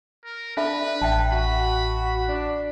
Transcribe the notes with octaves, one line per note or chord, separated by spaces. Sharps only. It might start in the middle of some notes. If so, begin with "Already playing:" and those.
A#4
D4 A4 B4 E5 B5
A1 E5 G5 A5
F#4 B5
D4